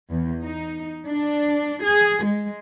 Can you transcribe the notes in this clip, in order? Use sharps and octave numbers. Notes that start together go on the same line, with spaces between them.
E2
D#4
D4
G#4
G#3